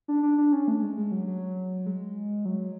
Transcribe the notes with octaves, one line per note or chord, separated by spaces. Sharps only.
D4
D4
D4
C#4
A3
G#3
G#3
F#3
F#3
G#3
F#3